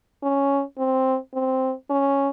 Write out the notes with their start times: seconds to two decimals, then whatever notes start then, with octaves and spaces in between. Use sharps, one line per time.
0.23 C#4
0.78 C4
1.34 C4
1.90 C#4